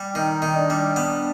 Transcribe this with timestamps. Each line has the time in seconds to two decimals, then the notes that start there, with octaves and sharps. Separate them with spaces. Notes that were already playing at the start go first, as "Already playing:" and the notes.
Already playing: G3
0.15 D#3 D#4
0.42 D#3
0.56 D4
0.70 G3
0.96 B3